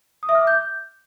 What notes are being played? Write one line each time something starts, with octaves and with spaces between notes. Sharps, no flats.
D#6
E5
F6
D6
G6